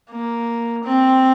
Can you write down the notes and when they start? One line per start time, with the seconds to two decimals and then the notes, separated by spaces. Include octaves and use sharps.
0.11 A#3
0.84 C4